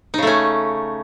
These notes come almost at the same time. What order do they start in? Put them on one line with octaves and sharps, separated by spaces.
D#4 C#3 A3 C#4